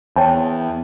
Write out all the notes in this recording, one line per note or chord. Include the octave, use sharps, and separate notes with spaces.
E2 C#5 G5 A5